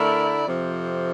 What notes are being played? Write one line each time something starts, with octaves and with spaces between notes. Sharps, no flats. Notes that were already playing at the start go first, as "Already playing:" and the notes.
Already playing: D3 A3 E4 A#4 D5
F2 C3 F3